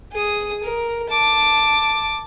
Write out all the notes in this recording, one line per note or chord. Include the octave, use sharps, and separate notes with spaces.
G#4 D#6
A#4
A5 D6